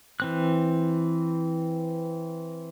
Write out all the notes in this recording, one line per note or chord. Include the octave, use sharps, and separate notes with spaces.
E3 C4 F#6